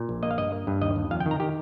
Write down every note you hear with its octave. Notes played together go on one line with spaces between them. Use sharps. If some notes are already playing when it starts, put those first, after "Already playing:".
Already playing: A#2
A#1
A#3 D#5
F5
G2 D#5
A#3
G2
D#2 D#5
D#2
F2 F5
G5
D#3
A#5
D#3 G4